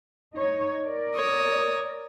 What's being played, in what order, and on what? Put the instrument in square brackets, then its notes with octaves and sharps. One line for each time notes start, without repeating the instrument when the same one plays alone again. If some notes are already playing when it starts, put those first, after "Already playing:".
[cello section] D#4 C#5
A#4 D5
[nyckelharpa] C#5 D#6